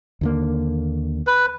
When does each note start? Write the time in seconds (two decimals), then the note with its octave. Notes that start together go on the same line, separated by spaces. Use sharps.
0.21 D#2 D3 A#3
1.27 B4